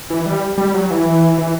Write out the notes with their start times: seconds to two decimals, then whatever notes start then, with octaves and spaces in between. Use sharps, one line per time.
0.10 E3
0.26 G3
0.58 G3
0.74 F#3
0.90 E3
1.38 E3